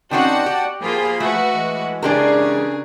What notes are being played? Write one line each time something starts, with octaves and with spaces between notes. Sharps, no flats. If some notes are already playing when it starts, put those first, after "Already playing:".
D#3 C4 C#4 F#4 D5 F#5 G5 A5
G4
F3 A#3 F4 G#4 C5 B5
A3 F#4 B4
E3 G#3
C#3 D4 G4 G#4 A#4